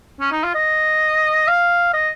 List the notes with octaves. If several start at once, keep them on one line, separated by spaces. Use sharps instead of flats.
C#4
D#4
F4
D#5
F5
D#5